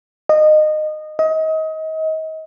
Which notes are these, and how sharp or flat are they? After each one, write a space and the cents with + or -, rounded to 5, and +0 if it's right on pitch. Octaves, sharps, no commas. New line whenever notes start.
D#5 -20
D#5 +30